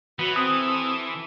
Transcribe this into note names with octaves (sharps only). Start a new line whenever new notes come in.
E3 B3 F#4 B4 C#5
C4 A4 E5 D#6